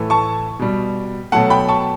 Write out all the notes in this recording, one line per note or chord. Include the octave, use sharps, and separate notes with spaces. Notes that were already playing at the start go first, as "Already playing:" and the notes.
Already playing: A2 E3 A3
A5 C#6
B2 G3
B2 F#3 A3 F#5 A5
G5 B5
A5 C#6